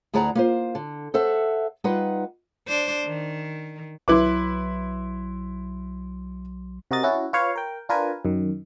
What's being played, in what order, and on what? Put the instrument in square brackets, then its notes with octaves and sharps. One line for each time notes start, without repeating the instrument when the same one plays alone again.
[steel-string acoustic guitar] D2 E4 G#4 D5 F#5 A#5
A#3 F4 C5
D3
A4 C5 E5 F#5
G3 D#4 F4 B4 F#5
[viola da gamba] D4 C5
D#3
[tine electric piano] B1 F#3 C6 [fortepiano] E4 B4 D6
[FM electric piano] C3 F#4 A#4 D#5 A6
C#4 E4 F#4
F4 B4 C#5 F5
A#4 G5
D4 F4 A#4 B4 G#5
F#2 D#3